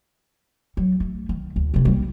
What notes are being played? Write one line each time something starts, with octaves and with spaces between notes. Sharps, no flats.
F#3
A3
D#3
D2
C3 A3
G3 A#3